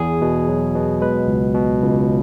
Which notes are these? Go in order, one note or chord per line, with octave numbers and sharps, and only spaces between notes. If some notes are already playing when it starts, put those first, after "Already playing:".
Already playing: E2 G#4
B2
F#3
B2
G#3 B4
C#2
B2
C#2